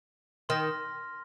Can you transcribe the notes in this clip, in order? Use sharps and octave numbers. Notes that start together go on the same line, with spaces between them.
D#3 C6 F6 A#6